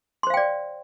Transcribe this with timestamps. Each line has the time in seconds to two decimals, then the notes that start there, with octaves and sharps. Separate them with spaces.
0.23 C6
0.27 C5
0.30 F5
0.34 G5
0.37 D5